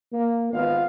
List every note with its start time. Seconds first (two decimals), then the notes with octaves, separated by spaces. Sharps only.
0.12 A#3
0.52 G#1 B3 F4 F5